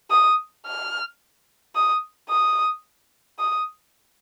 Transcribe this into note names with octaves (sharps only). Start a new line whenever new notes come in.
D#6
F6
D#6
D#6
D#6